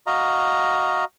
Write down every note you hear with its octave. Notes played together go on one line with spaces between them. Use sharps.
F#4 D#5 F5 A#5